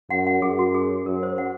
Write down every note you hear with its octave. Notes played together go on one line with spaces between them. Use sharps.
F#2 F#5
F#5
F#2 G#4
F#4
G#4
F#2 A#4
C5
F#5